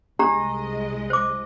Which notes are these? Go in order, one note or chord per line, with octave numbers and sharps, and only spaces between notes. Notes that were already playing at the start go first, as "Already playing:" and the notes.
C2 G#3 D4 G4 D#5 A#5
C5 D6